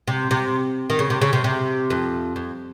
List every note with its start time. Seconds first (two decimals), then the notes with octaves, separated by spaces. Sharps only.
0.07 C3
0.31 C3
0.90 D#3
0.99 C#3
1.10 C3
1.21 C#3
1.33 C3
1.44 C3
1.90 F2
2.36 F2